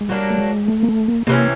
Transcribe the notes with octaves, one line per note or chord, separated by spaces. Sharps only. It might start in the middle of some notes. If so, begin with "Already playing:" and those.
G#3
F#3 G3 A#3 D4
A3
G#3
A3
A#3
A3
A#3
C3 E3 A3 A#3 C#4